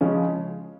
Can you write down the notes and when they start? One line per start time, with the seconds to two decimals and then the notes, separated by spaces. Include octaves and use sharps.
0.01 C#3 F3 G#3 C#4